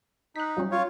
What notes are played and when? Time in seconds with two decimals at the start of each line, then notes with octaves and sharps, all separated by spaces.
0.36 D#4 F#6 B6
0.57 F#3 G3 C#4
0.71 F4 C#5